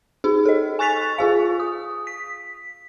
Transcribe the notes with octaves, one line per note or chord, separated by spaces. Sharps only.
D#4 G#4
A4 D#5
G#5 C#6 F#6 A6 B6 F7
F4 G#4 F5
D#6
B6